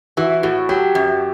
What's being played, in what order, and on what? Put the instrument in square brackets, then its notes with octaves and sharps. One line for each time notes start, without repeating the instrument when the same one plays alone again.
[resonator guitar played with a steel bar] E3 [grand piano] F#4
[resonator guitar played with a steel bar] A2 [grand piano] F#4
[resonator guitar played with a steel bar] F#3 [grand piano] G4
[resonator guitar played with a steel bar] F#2